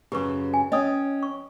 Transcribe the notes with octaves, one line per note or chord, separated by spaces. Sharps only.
F#2 C#3 G4 B4 C#6
G#5
C#4 D#5 G5 D#6
C#6